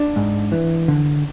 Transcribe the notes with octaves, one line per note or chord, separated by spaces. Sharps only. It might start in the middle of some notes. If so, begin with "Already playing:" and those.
Already playing: D4
G#2
E3
D3